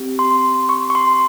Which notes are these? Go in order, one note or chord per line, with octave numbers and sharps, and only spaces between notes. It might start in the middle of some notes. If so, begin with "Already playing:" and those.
Already playing: C4 G4
C6
C#6
C#6
C6